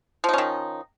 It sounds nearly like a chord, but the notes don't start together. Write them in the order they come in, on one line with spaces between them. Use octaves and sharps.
F3 D#4 C#4 D#3